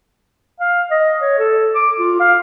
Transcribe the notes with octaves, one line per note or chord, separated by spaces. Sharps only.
F5
D#5
C#5
A4
D6
F4
F5